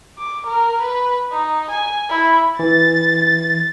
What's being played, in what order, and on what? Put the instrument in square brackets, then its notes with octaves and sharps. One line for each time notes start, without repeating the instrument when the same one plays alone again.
[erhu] D6
A#4
B4
D#4
G#5
E4
[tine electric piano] E3 [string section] A6